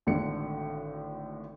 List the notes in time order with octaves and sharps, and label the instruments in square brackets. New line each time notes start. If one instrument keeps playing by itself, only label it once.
[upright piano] G#1 A2 D3 F#4 C#7